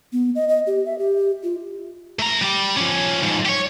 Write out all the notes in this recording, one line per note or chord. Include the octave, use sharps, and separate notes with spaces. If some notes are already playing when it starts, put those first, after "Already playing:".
B3
D#5
D#5
G4
E5
G4
F4
A3 A#5
G3 G4
F3 C#4
F2 G#2
G4 C#5